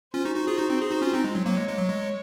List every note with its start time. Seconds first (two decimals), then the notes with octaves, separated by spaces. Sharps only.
0.14 C#4 F4 C5
0.25 D#4 F#4
0.36 D#4 F#4
0.47 F4 G#4
0.58 D#4 F#4
0.69 C4 D#4
0.82 G#4
0.91 D#4 F#4
1.02 C#4 F4
1.13 C4 D#4
1.24 G#3
1.35 F#3
1.45 F#3 A#3 C#5
1.57 G#3
1.68 G#3
1.78 F#3
1.89 G#3